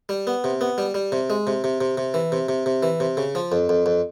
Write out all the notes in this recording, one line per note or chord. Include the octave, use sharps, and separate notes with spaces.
G3
B3
C3
B3
G3
G3
C3
G#3
C3
C3
C3
C3
E3
C3
C3
C3
E3
C3
C#3
F3
F2
F2
F2